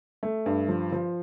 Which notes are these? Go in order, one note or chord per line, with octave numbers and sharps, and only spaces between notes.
A3
G2
F3
F3